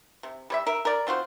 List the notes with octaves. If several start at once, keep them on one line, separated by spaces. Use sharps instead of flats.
C3
G3 C#5 E5
A#4 E5
A#4 D5
C4 F4 F#4 C5